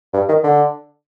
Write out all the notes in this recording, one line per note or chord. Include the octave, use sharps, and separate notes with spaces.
G2
D#3
D3